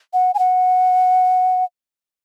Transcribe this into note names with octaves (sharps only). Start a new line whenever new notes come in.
F#5
G#5
F#5